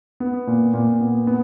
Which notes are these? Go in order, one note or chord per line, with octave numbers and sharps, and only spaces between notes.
B3
A#2
A#2
B3
B3